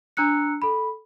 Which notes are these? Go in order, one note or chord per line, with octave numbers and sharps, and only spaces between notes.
D4 A#5 E6 F#6 C#7
A4 B5